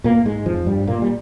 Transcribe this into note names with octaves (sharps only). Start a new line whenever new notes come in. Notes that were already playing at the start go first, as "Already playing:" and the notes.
A#2 A#3
G#2 G#3
F2 F3
G2 G3
A#2 A#3
G3